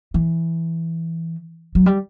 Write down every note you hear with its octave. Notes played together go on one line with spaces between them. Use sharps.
E3
F#3
G3